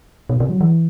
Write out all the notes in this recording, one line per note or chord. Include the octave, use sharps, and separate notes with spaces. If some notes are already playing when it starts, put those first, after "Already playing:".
B2
C3
F#3
E3